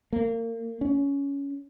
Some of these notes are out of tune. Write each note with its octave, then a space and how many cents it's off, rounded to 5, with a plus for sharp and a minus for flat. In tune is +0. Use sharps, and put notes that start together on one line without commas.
A#3 -30
C#4 +15